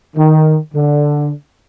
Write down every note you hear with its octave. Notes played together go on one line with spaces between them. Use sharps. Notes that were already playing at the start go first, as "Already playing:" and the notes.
D#3
D3